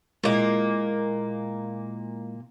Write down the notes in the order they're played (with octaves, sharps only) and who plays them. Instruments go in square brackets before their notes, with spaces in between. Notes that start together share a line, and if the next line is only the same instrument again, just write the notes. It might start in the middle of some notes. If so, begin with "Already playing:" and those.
[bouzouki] A#2 A#3 [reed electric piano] G#3 E4 D#5